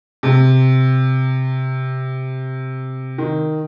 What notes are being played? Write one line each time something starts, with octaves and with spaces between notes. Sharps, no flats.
C3
D#3